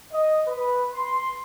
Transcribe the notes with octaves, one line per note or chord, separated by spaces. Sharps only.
D#5
B4
C6